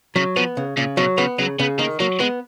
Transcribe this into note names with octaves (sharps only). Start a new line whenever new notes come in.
C#3 F#3
F3 B3
C#3
A#2 C#3
B2 F#3
C#3 B3
C#3 F#3
C#3 B3
D#3 A#3
F#3 A#3
G#3 B3